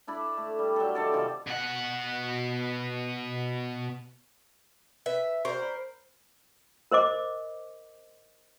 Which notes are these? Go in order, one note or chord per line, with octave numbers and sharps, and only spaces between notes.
D4 E4 D5 B5
A3
G3
F#3 G3 A4
D#3 A4 D5
C3 D#3 F3 G3
B2 F#5
B4 E5
F#4 A#4 C5 D5
B5
A#4 C5 D#5 D6